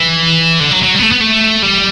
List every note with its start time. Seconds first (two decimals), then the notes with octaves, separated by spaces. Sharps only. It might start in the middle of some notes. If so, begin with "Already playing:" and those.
Already playing: E3
0.60 D3
0.71 F#3
0.83 F#3
0.94 G3
0.99 B3
1.03 A3
1.12 B3
1.21 A3
1.63 G3